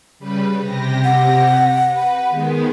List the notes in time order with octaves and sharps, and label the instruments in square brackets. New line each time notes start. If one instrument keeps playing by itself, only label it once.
[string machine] C#3 G3 B4
C3 G4 A#6
[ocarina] F#5
[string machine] B4
D#3 G#3 B3